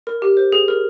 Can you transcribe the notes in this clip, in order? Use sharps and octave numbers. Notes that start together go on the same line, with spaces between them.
A#4
G4
C5
G#4
A#4